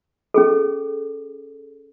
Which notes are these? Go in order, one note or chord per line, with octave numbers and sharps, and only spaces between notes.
C#4 G#4 A4